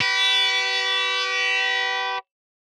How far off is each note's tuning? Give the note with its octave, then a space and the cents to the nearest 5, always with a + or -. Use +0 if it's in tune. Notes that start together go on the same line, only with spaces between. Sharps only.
G4 -35 B4 +0